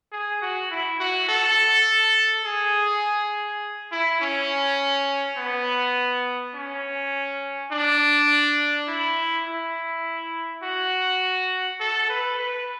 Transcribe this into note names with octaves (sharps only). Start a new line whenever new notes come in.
G#4
F#4
E4
F#4
A4
G#4
E4
C#4
B3
C#4
D4
E4
E4
F#4
A4
B4
B4